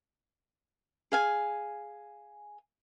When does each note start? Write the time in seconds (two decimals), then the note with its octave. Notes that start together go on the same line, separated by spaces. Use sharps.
1.12 G#4 F5 G#5